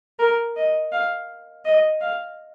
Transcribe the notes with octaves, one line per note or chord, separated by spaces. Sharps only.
A#4
D#5
F5
D#5
F5